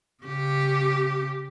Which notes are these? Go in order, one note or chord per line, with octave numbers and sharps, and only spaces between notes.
C#3 G4